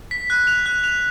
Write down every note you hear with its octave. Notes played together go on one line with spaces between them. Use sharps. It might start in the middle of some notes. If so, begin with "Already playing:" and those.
B6
F#6
F7
F#6
F7